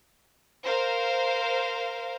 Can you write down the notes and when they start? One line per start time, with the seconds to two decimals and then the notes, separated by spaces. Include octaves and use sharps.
0.65 A#4 C5 F5